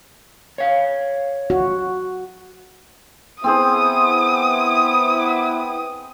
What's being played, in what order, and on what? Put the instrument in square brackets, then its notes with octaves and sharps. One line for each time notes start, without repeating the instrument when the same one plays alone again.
[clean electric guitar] C#5 F5
[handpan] F#4
[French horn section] B3 E4 [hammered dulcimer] C4 G#4 C5 [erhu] D#6